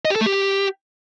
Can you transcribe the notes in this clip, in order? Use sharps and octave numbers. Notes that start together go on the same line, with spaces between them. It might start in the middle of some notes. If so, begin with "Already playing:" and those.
D#5
G4
A4
A3
G4